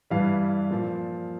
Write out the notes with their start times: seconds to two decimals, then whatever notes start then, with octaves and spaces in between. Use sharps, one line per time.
0.10 G2 E3 G3 F5
0.71 A#2 F3